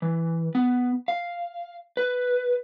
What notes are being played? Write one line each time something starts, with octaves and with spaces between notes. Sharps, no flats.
E3
B3
F5
B4